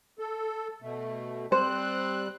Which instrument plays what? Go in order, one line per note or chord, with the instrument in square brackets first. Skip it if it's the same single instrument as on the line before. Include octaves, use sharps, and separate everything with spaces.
[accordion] A4
B2 A3
[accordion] G3 F#6 [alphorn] C4 [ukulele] C5